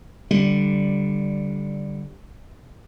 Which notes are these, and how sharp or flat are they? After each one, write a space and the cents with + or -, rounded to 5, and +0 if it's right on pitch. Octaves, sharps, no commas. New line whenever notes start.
D3 -5 G3 +0